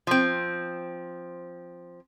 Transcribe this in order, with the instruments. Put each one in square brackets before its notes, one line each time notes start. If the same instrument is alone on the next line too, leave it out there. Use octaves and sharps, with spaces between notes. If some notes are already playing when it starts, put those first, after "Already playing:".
[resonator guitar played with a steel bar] F3 C4